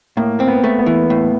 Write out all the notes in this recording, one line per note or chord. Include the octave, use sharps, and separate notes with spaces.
A2 A#3
C4
B3
A3
B3
E3
A2